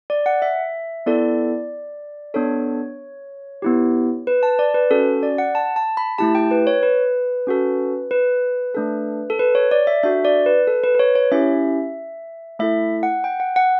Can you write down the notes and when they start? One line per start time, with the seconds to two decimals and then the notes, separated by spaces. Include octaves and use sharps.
0.10 D5
0.26 F#5
0.42 E5
1.06 B3 E4 A4 D5
2.34 B3 D4 A4 C#5
3.62 B3 E4 G4
4.27 B4
4.43 A5
4.59 D5
4.74 B4
4.91 C#4 F#4 A4
5.23 D5
5.38 F#5
5.55 A5
5.76 A5
5.97 B5
6.18 A3 E4 G4 A5
6.35 G5
6.51 B4
6.67 C#5
6.83 B4
7.47 C#4 F#4 A4
8.11 B4
8.75 A3 D4 A4
9.30 A4
9.39 B4
9.55 C#5
9.71 D5
9.87 E5
10.03 D4 F#4 A4 E5
10.25 D5
10.46 B4
10.67 A4
10.84 B4
10.95 B4
10.99 C#5
11.15 C#5
11.32 C#4 E4 G4 E5
12.59 A3 E4 A4 E5
13.03 F#5
13.24 G5
13.40 F#5
13.56 F#5